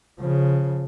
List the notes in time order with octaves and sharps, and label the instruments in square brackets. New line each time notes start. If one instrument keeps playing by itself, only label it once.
[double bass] C#3 F3